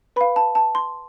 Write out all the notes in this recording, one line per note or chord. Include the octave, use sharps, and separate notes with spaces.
B4 F5 B5
A5
A5
C6